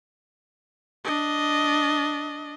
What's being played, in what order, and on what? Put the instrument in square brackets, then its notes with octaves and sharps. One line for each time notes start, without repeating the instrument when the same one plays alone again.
[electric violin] D4 D#5